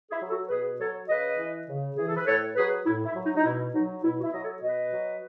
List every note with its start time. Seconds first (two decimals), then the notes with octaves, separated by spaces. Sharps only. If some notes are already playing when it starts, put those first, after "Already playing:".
0.10 E4 G#4
0.20 F#3
0.30 F#4 A4
0.49 B2 G#4 B4
0.78 F#3 A4 C#5
1.08 C#3 B4 D#5
1.38 E3
1.67 C#3
1.97 E3 G#4
2.07 A4
2.16 B4
2.26 A2 A4 C#5
2.55 F#3 G#4 B4
2.85 A2 E4
3.05 E4
3.14 F#3
3.24 D#4
3.35 D#4
3.44 B2 E4
3.73 F#3 D#4
4.02 B2 E4
4.18 F#4
4.22 E4
4.32 F#3 D#5
4.42 A4 C#5
4.62 B2 B4 D#5
4.91 F#3